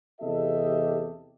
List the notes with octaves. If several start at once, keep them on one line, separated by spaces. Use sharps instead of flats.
E2 C3 G4 A4 D#5 E5